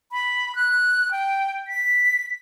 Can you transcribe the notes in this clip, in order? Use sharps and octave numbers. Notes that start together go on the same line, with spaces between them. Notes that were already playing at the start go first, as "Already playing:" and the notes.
B5
F#6
G5
B6